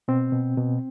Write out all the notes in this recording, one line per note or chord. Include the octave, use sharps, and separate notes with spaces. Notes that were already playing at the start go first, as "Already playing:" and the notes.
B2 C4
B2
B2